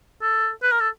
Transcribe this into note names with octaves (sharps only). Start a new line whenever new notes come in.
A4
B4
A#4
A4